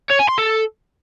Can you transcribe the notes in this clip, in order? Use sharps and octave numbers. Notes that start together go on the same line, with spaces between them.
C#5
G#5
C6
A4